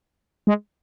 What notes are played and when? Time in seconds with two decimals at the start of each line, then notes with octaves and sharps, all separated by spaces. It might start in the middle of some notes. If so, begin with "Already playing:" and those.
0.47 G#3